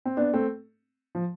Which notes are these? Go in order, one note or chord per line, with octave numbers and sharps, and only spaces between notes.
C4
B3 D4
A3 C4
F3